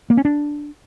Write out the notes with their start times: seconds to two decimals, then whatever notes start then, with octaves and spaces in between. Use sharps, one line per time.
0.10 A#3
0.17 C#4
0.25 D4